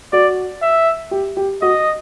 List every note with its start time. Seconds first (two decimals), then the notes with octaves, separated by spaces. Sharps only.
0.13 F#4 D5
0.62 E5
1.11 G4
1.37 G4
1.62 F#4 D#5